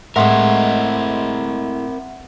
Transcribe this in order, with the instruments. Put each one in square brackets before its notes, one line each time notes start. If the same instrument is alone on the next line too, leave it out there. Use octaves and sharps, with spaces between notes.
[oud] A2 G#3 [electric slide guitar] C4 A#4 [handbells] E5 F#5 C6